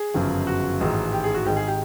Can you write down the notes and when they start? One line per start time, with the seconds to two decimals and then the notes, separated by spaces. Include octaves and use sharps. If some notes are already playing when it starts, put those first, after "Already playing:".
Already playing: G#4
0.14 G1 F#2 C#3 F3
0.47 F#4
0.81 A1 G#2 D#3 G#3
1.13 G4
1.24 G#4
1.35 F#4
1.45 G#1 G#2 D#3 G#3 G4
1.57 G#4
1.68 G4